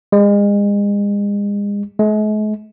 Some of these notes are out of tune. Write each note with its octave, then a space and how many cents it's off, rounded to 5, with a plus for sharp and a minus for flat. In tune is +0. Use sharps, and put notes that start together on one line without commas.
G#3 -35
G#3 +45